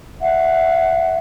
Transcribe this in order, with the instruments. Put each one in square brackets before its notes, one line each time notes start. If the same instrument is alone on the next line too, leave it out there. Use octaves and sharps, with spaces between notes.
[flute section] E5 F#5